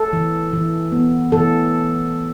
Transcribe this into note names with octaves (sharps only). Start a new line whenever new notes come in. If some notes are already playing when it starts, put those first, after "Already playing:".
Already playing: A4
E3
E3
B3
E3 A4